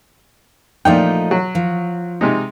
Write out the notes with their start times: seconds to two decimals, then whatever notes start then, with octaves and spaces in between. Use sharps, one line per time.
0.85 A#2 F3 A3 D4 D#4 G5
1.31 F#3
1.55 F3
2.21 C3 G#3 D#4